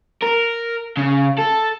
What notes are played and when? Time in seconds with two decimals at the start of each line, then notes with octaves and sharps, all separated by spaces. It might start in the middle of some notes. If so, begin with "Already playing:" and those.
0.23 A#4
0.97 C#3
1.39 A4